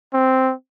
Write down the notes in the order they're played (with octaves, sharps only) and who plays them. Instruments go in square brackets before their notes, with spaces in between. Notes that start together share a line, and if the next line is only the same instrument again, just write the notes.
[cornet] C4